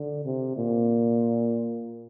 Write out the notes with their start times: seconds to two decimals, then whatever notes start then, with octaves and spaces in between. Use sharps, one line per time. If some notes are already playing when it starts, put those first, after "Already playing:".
Already playing: D3
0.25 C3
0.56 A#2